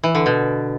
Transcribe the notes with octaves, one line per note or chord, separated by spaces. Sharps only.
E3
D3
B2